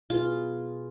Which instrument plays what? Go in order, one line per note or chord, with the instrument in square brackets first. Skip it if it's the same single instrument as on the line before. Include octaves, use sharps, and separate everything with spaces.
[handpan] B2 G#4 B4 [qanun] F4